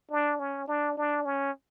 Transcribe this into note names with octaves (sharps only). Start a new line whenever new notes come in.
D4
C#4
D4
D4
C#4